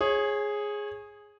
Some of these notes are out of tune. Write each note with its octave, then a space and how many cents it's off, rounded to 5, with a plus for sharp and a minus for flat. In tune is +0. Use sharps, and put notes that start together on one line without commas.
G#4 +0 C#5 -25